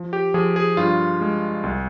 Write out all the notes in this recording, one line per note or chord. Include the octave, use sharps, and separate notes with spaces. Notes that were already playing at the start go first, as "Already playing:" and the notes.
Already playing: F3
G4
F3 G#4
G#4
G2 F4
G#3
C2